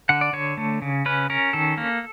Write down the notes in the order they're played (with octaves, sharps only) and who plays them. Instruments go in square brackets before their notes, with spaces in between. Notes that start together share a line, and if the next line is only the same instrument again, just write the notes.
[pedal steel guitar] D3 F#5
D5
D3 C#5
A3
C#3
C#4 B4
C#4 A#4
D#3 A4
A#3